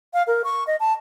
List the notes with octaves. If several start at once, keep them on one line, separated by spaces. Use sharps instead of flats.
F5
A#4
C#6
D#5
A5